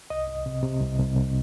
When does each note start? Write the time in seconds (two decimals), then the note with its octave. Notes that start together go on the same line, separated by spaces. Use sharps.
0.10 C2 D#5
0.28 C2
0.46 C3
0.63 C3
0.81 C2
0.99 C2
1.16 C2